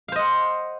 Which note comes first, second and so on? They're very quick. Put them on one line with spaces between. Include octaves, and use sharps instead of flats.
F5 C5 D#5 F#5